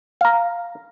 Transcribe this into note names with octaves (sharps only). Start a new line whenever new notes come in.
F5 A#5